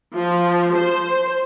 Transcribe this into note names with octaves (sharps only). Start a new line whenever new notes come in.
F3
C5